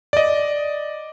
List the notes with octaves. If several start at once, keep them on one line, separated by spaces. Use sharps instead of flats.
D5 D#5